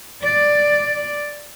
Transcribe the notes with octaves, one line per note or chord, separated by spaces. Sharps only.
D5